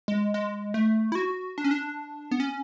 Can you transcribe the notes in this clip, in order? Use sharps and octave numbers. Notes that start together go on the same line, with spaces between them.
G#3
G#3
A3
E4
F#4
D4
C#4
D4
B3
C#4